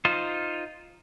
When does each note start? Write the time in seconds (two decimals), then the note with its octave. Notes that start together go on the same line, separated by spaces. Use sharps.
0.05 D#4 F4 C5